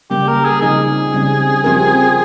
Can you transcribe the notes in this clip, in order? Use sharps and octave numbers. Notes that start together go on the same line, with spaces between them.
C#3 G3 A#3 G4
A#4
G#4
C#3 F3 C4 D#4 G#4
C#3 G3 C4
F3 C4 G4 A#4